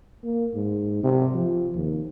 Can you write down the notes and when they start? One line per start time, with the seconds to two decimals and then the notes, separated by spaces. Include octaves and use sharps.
0.23 A#3
0.55 G#2
1.03 C3
1.35 F3
1.75 D#2